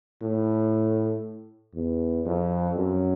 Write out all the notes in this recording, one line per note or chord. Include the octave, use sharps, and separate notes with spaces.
A2
E2
F2
F#2